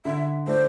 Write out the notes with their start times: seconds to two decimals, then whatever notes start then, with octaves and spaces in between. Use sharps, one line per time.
0.05 D3 E5
0.47 A3 D4 C5